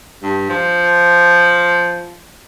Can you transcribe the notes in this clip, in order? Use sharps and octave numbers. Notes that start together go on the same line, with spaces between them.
G2
F3